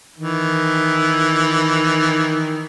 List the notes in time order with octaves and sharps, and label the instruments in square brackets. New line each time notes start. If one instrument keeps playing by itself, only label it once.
[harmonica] D#3 E3